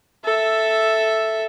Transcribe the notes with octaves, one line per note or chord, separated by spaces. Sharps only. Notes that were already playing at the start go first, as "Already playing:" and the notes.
A4 E5